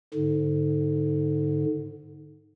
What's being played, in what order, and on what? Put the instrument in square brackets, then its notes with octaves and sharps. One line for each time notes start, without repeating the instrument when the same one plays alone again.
[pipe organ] G#2 D3